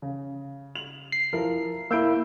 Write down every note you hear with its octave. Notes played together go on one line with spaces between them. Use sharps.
C#3
F7 F#7
C7
F3 E4 A#4
A#3 E4 E6 G6 D7